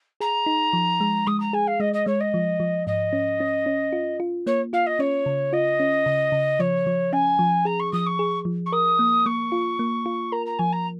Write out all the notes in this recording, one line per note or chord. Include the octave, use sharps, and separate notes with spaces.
G#4 A#5
D#4
F3
G#3
G#3 D#6
A#5
G#4 G#5
F5
G#3 D#5
D#5
G#3 C#5
D#5
F3
F3
G#2 D#5
C#4
C#4
C#4
F4
F4
A#3 C#5
F4 F5
D#5
C#4 C#5
C#3
F4 D#5
C#4
C#3
C#3
F3 C#5
F3
C#4 G#5
F3
G#4 A#5
C#6
F3 D#6
C#6
G#4
F3
C#6
A#4 D#6
A#3
A#3 C#6
F4
A#3
F4
A#4 A#5
A#5
F3 G#5
A#5